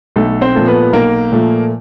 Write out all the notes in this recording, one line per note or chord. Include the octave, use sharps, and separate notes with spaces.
B1 A3 A4
C4 C5
A#2 F3 A3
B3 B4
B1 A#3 A#4
A#2 F3 A3